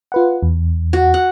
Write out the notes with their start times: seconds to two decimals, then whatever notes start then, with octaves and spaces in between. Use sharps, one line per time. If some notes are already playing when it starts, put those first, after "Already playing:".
0.12 F4 B4 F#5
0.43 E2
0.93 F#4
1.14 F#5